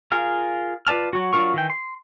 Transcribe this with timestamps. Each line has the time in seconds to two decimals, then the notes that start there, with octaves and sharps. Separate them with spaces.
0.12 F4 G#4 A#4 F5
0.87 F4 B4 D5 A5 F6
1.13 F#3 F#4
1.33 F#3 D4 F4 A#4 C#6
1.54 D#3 E3 G5
1.70 C6